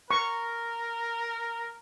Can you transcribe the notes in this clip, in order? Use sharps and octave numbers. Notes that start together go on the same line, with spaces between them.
A#4 C#6